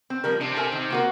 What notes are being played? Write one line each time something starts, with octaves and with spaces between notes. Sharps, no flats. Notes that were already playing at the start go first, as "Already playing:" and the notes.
C4
F3 G3 A#4
C3 C4 D4
A4 A#4 G#5
D#3
A#3 F#4 A#4